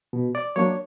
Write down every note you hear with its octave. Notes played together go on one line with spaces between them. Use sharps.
B2
D5
F#3 A#3 D4 C#5